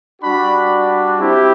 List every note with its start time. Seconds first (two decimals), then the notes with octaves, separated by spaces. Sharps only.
0.22 G3 D4 F#4 B5
1.19 C4 E4 G4